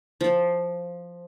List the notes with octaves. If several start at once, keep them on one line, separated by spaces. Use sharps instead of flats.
F3